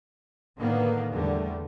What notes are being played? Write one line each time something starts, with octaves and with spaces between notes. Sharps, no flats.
A2 D3 D#3 A#3 B3
E2 D3 G3 A3